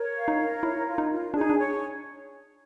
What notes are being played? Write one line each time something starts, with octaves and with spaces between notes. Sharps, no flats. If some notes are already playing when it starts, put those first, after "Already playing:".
Already playing: A#4 C#5
F5
D#4
A#4
E4 C#5
F4
D#4
F4
D4 G#4
D#4
D4
C#5